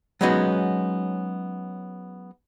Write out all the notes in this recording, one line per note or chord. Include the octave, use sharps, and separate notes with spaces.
F#3 G#3 B3 C#4 D#4 F#4